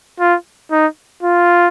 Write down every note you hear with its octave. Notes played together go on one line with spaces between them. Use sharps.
F4
D#4
F4